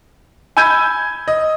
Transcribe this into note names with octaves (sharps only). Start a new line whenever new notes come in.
G#5 B5 E6 G6 G#6 D#7
D#5